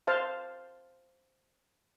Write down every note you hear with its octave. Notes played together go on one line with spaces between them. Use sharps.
C5 F5 A5